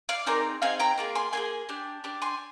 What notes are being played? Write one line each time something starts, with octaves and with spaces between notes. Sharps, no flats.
D5 F5
C4 D#4 G#4 A#4 D5
C4 D#4 G#4 F5 G#5
G5 A#5
A#3 F4 G#4
G#5 C6
A#3 F4 G#4 G#5 C6
D4 G4
D4 G4
G#5 C6